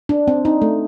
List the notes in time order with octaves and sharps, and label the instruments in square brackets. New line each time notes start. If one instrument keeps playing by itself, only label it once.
[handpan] D4
C4
D#4
A3